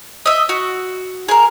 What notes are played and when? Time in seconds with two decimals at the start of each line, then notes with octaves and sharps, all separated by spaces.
0.26 D#5 E5
0.49 F#4
1.28 G#4 A#4